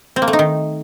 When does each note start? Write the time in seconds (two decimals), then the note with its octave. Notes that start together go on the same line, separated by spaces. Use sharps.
0.16 C4
0.22 A#3
0.28 A3
0.33 D#4
0.39 D#3